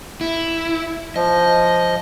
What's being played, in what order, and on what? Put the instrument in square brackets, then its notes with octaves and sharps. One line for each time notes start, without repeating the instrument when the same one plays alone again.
[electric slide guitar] E4
[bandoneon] F3 [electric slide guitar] D#5